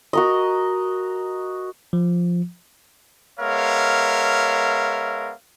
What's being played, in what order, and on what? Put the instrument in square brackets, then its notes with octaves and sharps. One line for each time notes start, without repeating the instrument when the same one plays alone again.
[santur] F#4 A#4 D#5
[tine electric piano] F3
[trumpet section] G#3 B3 A#4 C#5 E5 F5